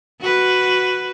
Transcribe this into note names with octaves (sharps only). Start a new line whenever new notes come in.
F#4 B4